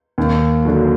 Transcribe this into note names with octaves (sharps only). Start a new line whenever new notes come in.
D#2
D3 F#3